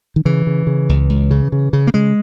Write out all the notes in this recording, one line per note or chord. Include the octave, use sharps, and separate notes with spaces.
D#3
C#3 E3
C#3
C#3
C#2
C#2
C#3
C#3
C#3
A#3
C#3 G#3